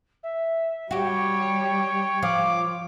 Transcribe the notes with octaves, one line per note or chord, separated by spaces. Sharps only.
E5
G3 F#4 G4 C#5 G5
F3 D6